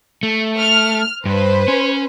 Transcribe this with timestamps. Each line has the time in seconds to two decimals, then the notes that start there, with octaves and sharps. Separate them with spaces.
0.23 A3
0.59 F6
1.26 G2 B4 C5
1.68 C#4